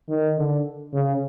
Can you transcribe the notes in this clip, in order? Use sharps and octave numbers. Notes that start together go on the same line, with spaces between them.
D#3
D3
C#3